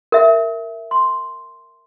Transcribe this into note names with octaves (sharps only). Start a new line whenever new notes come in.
A#4 E5
C6